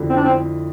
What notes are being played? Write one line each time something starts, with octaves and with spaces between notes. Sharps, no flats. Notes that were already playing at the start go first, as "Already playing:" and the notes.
Already playing: F2 D3 A3 E4
C4
D4
C4